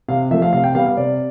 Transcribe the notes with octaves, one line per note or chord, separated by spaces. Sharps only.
C3 F5
F3 A3 E5
F5
C3 F5
G5
G3 B3 F5
F5
C3 D5